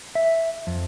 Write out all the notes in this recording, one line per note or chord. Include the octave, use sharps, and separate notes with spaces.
E5
F2